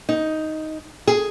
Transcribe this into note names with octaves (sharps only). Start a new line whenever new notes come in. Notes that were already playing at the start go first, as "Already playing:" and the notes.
D#4
G#4